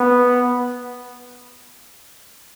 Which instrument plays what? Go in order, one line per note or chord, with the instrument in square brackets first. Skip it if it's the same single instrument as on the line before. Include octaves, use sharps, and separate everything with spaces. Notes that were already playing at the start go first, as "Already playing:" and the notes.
Already playing: [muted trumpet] B3